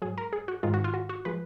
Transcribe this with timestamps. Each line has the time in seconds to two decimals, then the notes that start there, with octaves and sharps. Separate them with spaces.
0.02 F#3 G#4
0.05 G#2
0.18 A#4
0.33 G#4
0.48 F#4
0.63 G#2 D#3 G#3 F4
0.74 F#4
0.84 F4
0.94 F#4
1.09 F#4
1.25 F3 G#3 B4